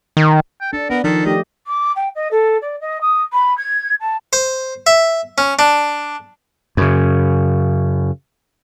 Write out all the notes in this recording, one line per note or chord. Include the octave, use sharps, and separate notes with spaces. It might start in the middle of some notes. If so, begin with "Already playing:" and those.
D#3
G5
D4 A4
B3 D4 A#4
D#3 F3 A4
A3 G4 D#5
D6
G5
D#5
A4
D5
D#5
D#6
B5
G#6
A5
C5
E5
C#4
D4
F#2 C#3